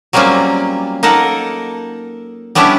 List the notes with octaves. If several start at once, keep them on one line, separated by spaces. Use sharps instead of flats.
F#3 G3 A#3 C4 C#4 F4
A#3 D#4 A4 A#4 F#5
G3 B3 C#4 D4 E4 G4